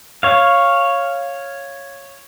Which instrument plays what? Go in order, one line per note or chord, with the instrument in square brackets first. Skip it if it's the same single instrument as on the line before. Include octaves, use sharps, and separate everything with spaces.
[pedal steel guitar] C#5 F5